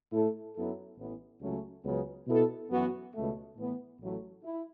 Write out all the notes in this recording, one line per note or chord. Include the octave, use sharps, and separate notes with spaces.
A2 A3 E4 A4
F#2 F#3 B3 E4 A4
A1 A2 E3 B3
C#2 C#3 F#3 A3 C#4
C#2 C#3 F#3 B3
B2 B3 E4 A4
F#2 E3 B3 F#4
C#2 B2 A3
A2 E3 B3
A1 A2 F#3 A3 E4
E4